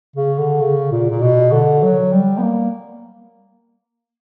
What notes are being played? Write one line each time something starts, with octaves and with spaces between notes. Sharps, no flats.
C#3
D3
C#3
A#2
A#2
B2
D3
F#3
G3
B3
A#3